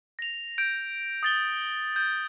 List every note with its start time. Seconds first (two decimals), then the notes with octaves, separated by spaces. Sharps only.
0.19 A#6 F7
0.58 G6 D7
1.23 D#6 A6 G7
1.96 G6